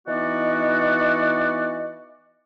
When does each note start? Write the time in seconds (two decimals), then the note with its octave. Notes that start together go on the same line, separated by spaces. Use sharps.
0.06 E3 B3 D#4 F#4 D5 D#5